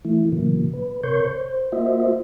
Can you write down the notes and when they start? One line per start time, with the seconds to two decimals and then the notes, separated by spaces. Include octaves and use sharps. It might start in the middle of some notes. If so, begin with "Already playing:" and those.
0.05 E3 A3 E4
0.32 A#2 C#3 E3 F#3 A#3
0.73 B4
1.03 C3 A#4 C#5 C6 C#6 G6
1.26 C5
1.72 A#3 F4 F#4 C5 D#5 E5